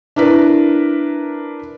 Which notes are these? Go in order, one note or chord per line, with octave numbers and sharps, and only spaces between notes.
D4 E4 A#4 B4